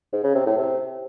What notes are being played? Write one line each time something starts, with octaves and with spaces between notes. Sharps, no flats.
G#2
C#3
C3
A2
C3